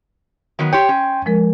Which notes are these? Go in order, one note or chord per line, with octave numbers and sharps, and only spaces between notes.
D#3 F#3 B3
G4 C#5 G5 C6
C#4
F3 G#3 A#4